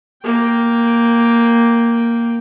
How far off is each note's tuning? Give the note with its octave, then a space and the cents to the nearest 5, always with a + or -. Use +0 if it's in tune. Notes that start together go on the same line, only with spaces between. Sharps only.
A#3 +0 G5 +0